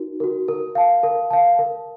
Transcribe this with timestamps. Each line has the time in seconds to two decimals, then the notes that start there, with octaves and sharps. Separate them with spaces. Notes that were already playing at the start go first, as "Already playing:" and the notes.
Already playing: D#4 F#4 A#4
0.20 F#4 A#4
0.48 A#4
0.75 F5 A5
1.03 A#4
1.31 F5 A5
1.59 A#4